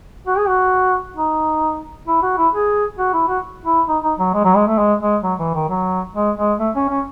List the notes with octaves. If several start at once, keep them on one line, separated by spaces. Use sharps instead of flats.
F#4
G#4
F#4
D#4
E4
F#4
E4
G#4
F#4
E4
F#4
E4
D#4
D#4
F#3
G#3
F#3
G#3
A3
G#3
G#3
F#3
E3
D#3
F#3
G#3
G#3
A3
C#4
C#4